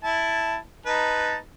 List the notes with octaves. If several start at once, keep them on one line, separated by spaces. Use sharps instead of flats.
E4 A5
D#4 B4 A5